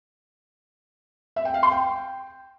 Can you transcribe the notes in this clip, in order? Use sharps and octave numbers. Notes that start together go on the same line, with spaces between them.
E5
G5
F5
C6
G5